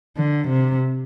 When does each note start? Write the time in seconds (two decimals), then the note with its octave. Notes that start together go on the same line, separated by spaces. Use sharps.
0.17 D3
0.48 C3